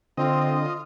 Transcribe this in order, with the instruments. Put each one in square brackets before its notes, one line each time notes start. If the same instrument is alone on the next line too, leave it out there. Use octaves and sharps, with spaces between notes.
[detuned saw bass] D3 [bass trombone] C4 [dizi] F4 [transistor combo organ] D#5